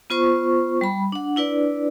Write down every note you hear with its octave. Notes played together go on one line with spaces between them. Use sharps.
B3 F4 C5 C#6
G3 B5
D4 F#5
D4 E4 B4 D5